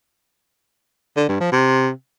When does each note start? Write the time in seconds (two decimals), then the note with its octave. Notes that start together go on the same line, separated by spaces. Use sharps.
1.16 D3
1.28 G2
1.40 F3
1.52 C3